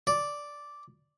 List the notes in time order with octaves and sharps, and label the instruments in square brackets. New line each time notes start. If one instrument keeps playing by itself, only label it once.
[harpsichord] D5